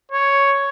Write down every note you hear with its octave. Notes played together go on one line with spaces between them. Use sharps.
C#5